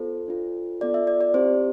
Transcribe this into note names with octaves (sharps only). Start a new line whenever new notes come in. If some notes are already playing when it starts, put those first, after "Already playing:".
Already playing: B3 F4 A4 C5
D4 F4 A4
B3 F4 A4 D5
E5
D5
D5
C4 E4 G4 C5